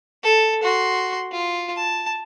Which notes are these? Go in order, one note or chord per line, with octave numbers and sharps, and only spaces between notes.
A4
F#4 C6
F4
A5